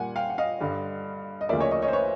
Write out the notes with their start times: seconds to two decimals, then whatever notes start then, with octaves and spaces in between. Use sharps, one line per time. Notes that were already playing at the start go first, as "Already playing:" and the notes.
Already playing: A#2 G3 A#3 F#5 G#5
0.16 F5 G5
0.30 F#5
0.38 D#5 F5
0.60 G2 D3 G3
1.41 D#5
1.49 D2 C#3 F3 A#3 D5 E5
1.60 C#5 D#5
1.71 C#5 D#5
1.82 C#5 D#5
1.88 C5
1.93 B4 C#5